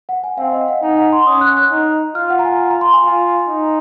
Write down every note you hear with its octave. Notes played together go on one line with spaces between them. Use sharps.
F#5
G#5
C4 F5
D#5
F#5
D#4 G#5
F#5
C6
C#4 D#6
F#6
F#6
D#4
F4 F6
F#5
A#5
G#5
A#5
C6
G#5
F4 G#5
D#4